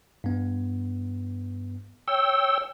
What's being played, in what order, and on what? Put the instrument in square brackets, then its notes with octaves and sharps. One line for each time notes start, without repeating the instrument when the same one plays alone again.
[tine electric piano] G2 B3
[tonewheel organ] C#5 G5 E6